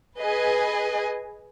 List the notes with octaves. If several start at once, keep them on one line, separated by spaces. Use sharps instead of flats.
G#4 B4 D#5 G#5